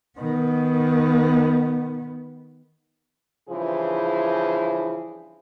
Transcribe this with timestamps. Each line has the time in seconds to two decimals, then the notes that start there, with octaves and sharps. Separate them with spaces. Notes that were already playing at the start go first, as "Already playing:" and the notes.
0.19 D#3 B3
3.49 G2 C#3 E3 F3 G#4 C5